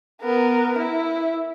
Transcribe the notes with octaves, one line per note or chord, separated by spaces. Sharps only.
B3 A#4
E4